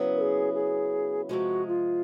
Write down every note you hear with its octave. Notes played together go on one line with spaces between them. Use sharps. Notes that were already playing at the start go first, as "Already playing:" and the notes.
Already playing: C#3 F#3 B3 E4
A#4
G#4
G#4
C3 F3 G#3 F#4
F4